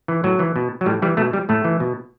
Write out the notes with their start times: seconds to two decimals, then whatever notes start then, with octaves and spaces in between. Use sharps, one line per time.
0.08 E3
0.24 A2 F#3
0.39 E3
0.56 B2
0.81 F#3
0.86 A2 G3
1.02 E3 G3
1.17 B2 A3
1.33 G3
1.49 A2 A3
1.64 E3
1.80 B2